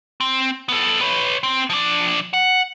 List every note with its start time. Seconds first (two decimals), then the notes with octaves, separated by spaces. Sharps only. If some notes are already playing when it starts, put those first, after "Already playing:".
0.20 C4
0.69 B3 A4
1.01 B4 C#5
1.43 C4
1.70 F3 D4
2.34 F#5